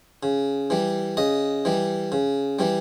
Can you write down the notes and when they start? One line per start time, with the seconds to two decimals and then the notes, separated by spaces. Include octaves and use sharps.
0.23 C#3
0.70 E3 G3
1.17 C#3 D#5
1.65 E3 G3
2.12 C#3
2.59 E3 G3